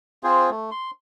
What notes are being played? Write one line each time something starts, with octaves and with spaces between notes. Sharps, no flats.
C4 F4 G#4 C5
A3
C6